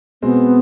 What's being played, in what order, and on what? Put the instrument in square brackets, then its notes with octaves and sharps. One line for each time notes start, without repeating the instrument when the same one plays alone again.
[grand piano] B2 G#3 C4 [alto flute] B3